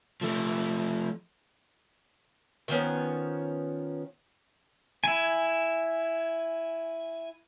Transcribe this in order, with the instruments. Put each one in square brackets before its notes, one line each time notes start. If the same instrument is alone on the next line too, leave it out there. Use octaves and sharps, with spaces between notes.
[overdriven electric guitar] F3 A3
[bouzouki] D#3 F3 B3 C#4
[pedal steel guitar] E4 G#5